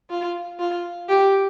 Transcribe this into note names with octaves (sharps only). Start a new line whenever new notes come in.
F4
F4
G4